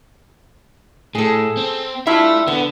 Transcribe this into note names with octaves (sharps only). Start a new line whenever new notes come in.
A2 G#4 A4
C4
G3 E4 F4 E5 A5
D3 B3